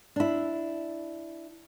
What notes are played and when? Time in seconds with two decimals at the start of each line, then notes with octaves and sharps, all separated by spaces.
0.16 D4 E4